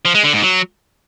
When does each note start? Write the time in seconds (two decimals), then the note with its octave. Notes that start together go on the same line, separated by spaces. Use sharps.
0.05 F3
0.15 G#3
0.24 D3
0.33 G#2
0.43 F#3